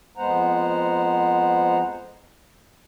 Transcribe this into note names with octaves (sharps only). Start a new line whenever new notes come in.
F2 G#3 B3 C5 F#5 A#5